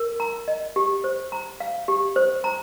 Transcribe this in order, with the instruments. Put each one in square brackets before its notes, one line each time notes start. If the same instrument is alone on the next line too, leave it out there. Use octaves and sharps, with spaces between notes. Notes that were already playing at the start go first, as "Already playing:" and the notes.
Already playing: [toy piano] A#4
A#5
D#5
G4
C5
A#5
F5
G4
C5
A#5